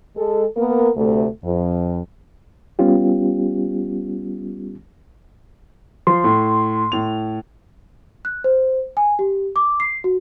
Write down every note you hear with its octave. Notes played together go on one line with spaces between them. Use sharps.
G#3 A4
A#3 B3 A#4
D2 C3 A3
F2
G3 B3 C#4 F4 G4
F3 C6
A2
A2 F7
F#6
C5
G#5
G4
D6
C7
F#4